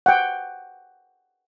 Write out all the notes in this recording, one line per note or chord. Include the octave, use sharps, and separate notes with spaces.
F#5 G5